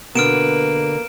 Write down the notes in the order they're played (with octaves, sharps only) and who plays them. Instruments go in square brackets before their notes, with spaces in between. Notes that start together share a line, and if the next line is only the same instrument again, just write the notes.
[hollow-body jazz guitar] B2 D3 [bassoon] A#3 [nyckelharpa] B4 [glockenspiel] F6 D7 E7